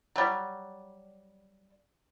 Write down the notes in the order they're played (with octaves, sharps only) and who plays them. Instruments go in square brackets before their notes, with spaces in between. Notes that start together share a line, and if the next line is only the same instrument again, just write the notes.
[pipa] F#3 G3